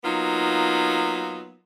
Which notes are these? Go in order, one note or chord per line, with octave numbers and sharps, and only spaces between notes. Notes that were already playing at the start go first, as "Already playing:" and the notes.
F#3 A#3 B3 D#4 F4